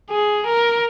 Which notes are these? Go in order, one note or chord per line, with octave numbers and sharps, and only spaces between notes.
G#4
A#4